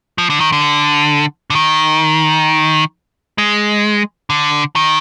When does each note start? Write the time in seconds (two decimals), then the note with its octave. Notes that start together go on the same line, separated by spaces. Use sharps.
0.18 F3
0.30 D3
0.40 D#3
0.52 D3
1.50 D3
1.55 D#3
3.38 G#3
4.30 D3
4.76 D#3